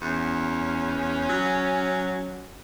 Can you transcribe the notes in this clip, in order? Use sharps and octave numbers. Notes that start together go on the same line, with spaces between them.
E2 C#4
F#3